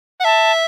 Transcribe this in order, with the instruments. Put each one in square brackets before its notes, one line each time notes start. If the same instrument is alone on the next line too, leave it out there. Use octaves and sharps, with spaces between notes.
[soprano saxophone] F#5
[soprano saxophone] E5 [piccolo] A5